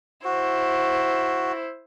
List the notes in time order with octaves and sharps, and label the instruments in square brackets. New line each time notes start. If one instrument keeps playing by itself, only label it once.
[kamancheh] E4 C5 [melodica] F#4